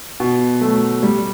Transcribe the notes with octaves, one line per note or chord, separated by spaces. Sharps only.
B2
F#3 A3
G3